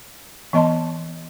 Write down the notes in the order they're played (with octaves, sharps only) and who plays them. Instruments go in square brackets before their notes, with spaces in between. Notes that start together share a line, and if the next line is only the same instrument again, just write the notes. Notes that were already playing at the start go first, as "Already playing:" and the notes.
[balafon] E3 B3 D#5 A5 C6